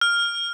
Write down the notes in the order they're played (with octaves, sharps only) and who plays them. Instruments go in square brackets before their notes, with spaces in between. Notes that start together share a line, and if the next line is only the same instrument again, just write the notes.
[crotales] F6